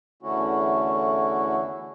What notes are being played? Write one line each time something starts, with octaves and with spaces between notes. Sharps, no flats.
E2 D3 A3 C#4 E4 F#4